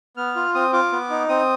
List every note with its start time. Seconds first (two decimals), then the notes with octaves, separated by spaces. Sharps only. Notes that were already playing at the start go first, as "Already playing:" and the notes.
0.17 B3 F6
0.36 F4
0.54 C4 D#6
0.73 F4 D6
0.92 B3
1.10 D#4
1.29 C4 D#6